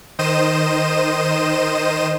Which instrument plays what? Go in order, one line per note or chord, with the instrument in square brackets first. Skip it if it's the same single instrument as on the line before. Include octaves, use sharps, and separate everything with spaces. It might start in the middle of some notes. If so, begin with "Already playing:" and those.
[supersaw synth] D#3 C5 D#5 D#7 E7